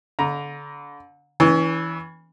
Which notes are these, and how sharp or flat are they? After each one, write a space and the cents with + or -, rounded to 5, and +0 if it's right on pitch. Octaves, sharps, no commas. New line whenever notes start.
D3 -25 A#5 +10
E3 -10 C#4 +30